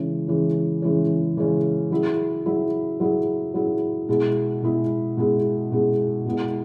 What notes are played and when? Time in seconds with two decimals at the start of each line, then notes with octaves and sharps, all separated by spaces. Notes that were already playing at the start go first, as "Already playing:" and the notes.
Already playing: C#3 E3 G#3 C#4
0.28 C#3 E3 G#3 C#4
0.82 C#3 E3 G#3 C#4
1.37 C#3 E3 G#3 C#4
1.91 F#3 E4 G#4
2.46 F#3 E4 G#4
3.00 F#3 E4 G#4
3.54 F#3 E4 G#4
4.09 B2 G#3 E4 G#4
4.63 B2 G#3 E4 G#4
5.17 B2 G#3 E4 G#4
5.72 B2 G#3 E4 G#4
6.26 B2 G#3 B3 E4